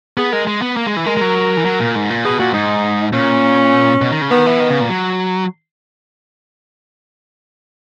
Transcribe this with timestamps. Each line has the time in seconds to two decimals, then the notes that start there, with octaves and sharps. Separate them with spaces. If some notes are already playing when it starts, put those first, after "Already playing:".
0.17 B3 G#4
0.32 G#3 A#4
0.47 G#3
0.62 B3
0.77 A#3
0.87 G#3
0.97 E3
1.06 G#3 A#4
1.17 G#3
1.21 F#3
1.57 E3
1.65 F#3
1.80 A#2
1.95 G#2
2.10 A#2
2.24 B2 G#4
2.39 A#2 F#4
2.54 G#2 D#4
3.13 A#2 C#4
4.01 B2
4.11 D#3
4.22 C#3
4.31 D#3 B3
4.46 E3
4.60 D#3
4.70 C#3
4.80 A#2
4.90 F#3